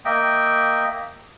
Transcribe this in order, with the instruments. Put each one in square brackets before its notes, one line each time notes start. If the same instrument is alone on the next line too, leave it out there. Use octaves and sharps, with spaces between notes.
[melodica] A#3 D#5 E5 G5